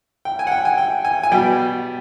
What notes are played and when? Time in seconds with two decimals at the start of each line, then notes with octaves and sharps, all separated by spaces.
0.25 G5
0.39 G#5
0.47 F#5
0.52 G5
0.65 G#5
0.78 G5
1.05 G#5
1.24 G#5
1.32 B2 G3 G5